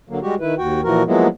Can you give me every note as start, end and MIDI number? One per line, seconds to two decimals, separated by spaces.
0.09 0.19 50
0.09 0.19 54
0.09 0.19 58
0.22 0.35 55
0.22 0.35 56
0.22 0.35 66
0.22 0.35 67
0.40 0.55 51
0.40 0.55 64
0.40 0.55 71
0.58 0.81 39
0.58 0.81 66
0.58 0.81 79
0.84 1.03 46
0.84 1.03 52
0.84 1.03 53
0.84 1.03 66
0.84 1.03 70
1.06 1.27 53
1.06 1.27 54
1.06 1.27 56
1.06 1.27 58
1.06 1.27 59
1.06 1.27 64